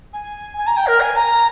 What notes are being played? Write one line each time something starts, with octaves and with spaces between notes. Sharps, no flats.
G#5
G#5
A#5
G5
A#4
G#5
A#5